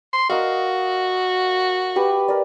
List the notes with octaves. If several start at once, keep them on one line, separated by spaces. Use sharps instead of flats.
C6
F#4 A#4 D#5 F5
G4 B4
A#4 D5